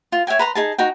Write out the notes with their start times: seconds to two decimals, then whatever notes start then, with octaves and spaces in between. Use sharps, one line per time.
0.12 F4
0.27 C#5 E5 G5 G#5
0.39 B4 A#5 C6
0.55 D#4 G#4 A5
0.78 D#4 F#4 G5